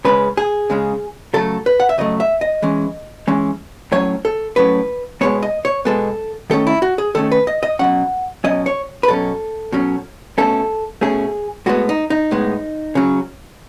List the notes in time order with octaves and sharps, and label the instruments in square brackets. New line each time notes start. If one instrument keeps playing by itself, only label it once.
[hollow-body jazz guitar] C#3 G#3 C#4 B4
G#4
C#3 G#3 C#4
C#3 F#3 A3 A4
B4
F#5
E5
C#3 F#3 A3 D#5
E5
D#5
E3 G#3 C#4
E3 G#3 C#4
A2 F#3 C#4 C#5
A4
A2 F#3 C#4 B4
B2 G#3 B3 C#5
D#5
C#5
B2 G#3 B3 A4
D#3 A3 C#4 A4
E4
F#4
G#4
D#3 A3 C#4 A4
B4
D#5
D#5
B2 F#3 C#4 F#5
B2 F#3 C#4 D#5
C#5
B4
B2 F#3 C#4 A4
B2 F#3 C#4
B2 A3 C#4 A4
B2 A3 C#4 G#4
A2 G#3 B3 F#4
D#4
D#4
A2 G#3 B3
C#3 F#3 C#4